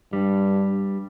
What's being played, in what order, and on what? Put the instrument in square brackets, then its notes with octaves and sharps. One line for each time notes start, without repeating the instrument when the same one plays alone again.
[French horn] G2 [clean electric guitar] G3